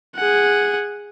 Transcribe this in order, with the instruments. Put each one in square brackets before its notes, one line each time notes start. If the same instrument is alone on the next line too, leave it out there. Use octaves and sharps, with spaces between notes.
[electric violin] G#4 F#5